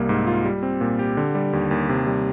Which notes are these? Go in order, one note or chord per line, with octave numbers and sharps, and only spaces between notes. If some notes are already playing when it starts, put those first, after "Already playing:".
Already playing: C2 G3 A#3
G#2
F4
G3
C4
A#2
G4
D3
G3
D#2
D#2
C3
G3